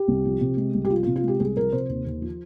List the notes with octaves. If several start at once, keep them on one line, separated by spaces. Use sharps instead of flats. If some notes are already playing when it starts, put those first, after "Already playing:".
Already playing: G4
C2
F3
C3
G#3
C2
G4
F3 F4
F4
C3
F4
G#3 G4
C2 G#4
F3 A#4
C3 C5
D#2
D#2
F3